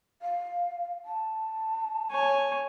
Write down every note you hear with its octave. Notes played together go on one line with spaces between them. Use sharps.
F5
A5
C#5 G#5